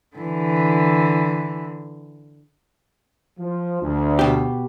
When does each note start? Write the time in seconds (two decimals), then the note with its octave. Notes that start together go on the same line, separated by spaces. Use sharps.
0.16 D3 E3
3.39 F3
3.82 D2
4.19 B2 G4